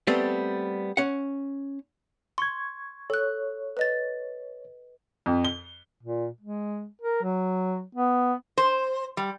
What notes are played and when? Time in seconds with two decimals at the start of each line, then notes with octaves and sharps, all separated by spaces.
0.07 G3 A3 B3 C4
0.97 C#4 F#5
2.38 C6 C#6 G#6
3.10 A4 C#5 F#6
3.77 B4 D#5 A6
5.26 F2
5.45 G7
6.03 A#2
6.41 G#3
7.01 A#4
7.23 F#3
7.95 B3
8.58 C5
9.17 G3